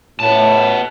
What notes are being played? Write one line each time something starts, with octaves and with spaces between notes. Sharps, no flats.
A2 B3 A5